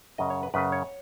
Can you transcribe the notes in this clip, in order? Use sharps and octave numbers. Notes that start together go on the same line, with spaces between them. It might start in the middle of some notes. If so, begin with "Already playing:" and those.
F#2 C#3 D#5
C#5
B4
F#2 C#3 B4
C#5